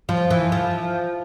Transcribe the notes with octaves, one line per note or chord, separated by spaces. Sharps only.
F3
E3
F3